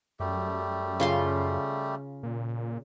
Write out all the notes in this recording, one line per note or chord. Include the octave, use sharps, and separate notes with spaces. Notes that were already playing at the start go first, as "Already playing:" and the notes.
F#2 G3 A3 G4
C#3 F4 C6
A#2